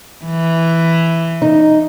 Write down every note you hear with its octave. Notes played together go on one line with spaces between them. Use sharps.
E3
D#4